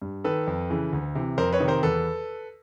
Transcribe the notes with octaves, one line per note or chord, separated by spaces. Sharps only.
G2
D#3 A4 B4
F2
C#3 E3
D2
C3 E3
F2 A#4 C5
B4 C#5
C3 D#3
A#4 C5
E2 A4 B4